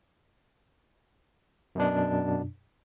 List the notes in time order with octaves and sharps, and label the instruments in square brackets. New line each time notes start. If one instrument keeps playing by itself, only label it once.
[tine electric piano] F#2 B2 D4